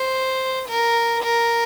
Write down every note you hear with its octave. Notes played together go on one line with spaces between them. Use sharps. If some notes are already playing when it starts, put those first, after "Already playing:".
Already playing: C5
A#4
A#4